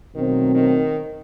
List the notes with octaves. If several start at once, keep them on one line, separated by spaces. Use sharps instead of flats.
B2 D#3 F#3 A3 C4
D#3